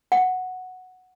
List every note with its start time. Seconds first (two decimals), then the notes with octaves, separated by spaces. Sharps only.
0.12 F#5